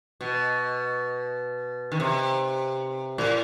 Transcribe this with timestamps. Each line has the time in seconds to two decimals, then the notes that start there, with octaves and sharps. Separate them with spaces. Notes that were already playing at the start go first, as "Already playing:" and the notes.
0.21 B2
1.92 D#3
2.00 C3
3.18 A2